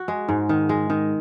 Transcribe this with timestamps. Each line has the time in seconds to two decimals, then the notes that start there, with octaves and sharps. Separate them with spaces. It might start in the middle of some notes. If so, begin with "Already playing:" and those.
Already playing: F#4
0.08 G#3
0.29 G#2
0.49 D#3
0.69 G#3
0.90 D#3